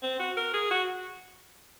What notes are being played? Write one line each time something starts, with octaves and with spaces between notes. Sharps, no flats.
C4
F#4
A#4
G#4
F#4